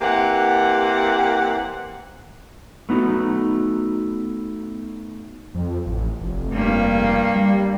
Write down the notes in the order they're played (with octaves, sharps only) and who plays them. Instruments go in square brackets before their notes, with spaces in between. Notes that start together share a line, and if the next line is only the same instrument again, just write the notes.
[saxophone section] E3 A#3 C4 G4 F#5
[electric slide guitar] A3 B3 D#4 F#4
[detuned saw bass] F2
A1
F1
[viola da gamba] G2 A#3
[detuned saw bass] G3